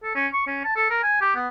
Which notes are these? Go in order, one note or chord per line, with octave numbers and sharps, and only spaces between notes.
A4
C#4
C#6
C#4
A5
A4
A#4
G#5
G4
B3